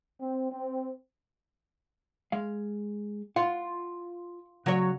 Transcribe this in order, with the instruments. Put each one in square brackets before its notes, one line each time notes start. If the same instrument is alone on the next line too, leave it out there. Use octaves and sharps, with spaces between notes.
[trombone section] C4
C4
[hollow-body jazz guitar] G#3 F5
[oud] F4 [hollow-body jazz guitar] F#5
[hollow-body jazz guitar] C#3 F#4 [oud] F#3 C#5